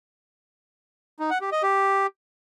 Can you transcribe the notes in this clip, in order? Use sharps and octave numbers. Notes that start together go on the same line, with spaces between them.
D#4
F#5
G4
D#5
G4